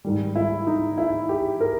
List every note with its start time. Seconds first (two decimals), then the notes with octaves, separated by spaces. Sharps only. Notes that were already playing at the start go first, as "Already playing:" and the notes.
0.05 G#2 D#3 G3
0.36 E4
0.67 D#4
0.98 E4
1.29 G4
1.61 A#4